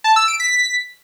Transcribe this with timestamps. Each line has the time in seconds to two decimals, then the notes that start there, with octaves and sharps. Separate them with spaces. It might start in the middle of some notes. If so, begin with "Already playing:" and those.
0.04 A5
0.16 E6
0.28 D7
0.40 B6